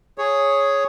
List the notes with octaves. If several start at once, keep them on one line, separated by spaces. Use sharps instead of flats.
G#4 C#5